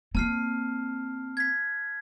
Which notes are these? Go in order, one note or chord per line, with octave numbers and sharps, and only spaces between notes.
A#3 C4 A5 F6 C7
G#6 B6